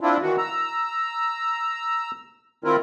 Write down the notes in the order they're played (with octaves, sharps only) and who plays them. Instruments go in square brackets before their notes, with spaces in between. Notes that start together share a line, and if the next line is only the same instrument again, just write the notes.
[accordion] C4 D4 E4 F4
D#3 E3 F#4
A#5 E6
D#3 C4 E4 F4 A#4